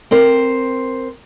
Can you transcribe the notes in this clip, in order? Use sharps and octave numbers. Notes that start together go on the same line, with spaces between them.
C4 A#4 C5